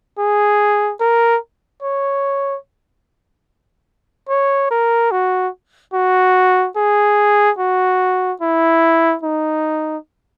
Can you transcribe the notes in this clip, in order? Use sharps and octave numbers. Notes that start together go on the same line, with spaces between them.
G#4
A#4
C#5
C#5
A#4
F#4
F#4
G#4
F#4
E4
D#4